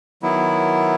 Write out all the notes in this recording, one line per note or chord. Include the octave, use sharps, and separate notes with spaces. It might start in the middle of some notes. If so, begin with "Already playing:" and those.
D#3 F#3 B3 E4